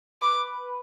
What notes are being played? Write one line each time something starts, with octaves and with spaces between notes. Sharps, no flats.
B4 D6